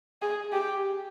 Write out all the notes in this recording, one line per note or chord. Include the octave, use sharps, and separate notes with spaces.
G#4
G4